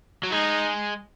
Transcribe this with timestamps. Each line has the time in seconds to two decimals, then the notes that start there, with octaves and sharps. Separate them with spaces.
0.23 F#3
0.31 G#3 D#4